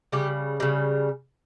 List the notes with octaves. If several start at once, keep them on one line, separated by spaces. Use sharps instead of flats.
C#3 G3 G4
C#3 G3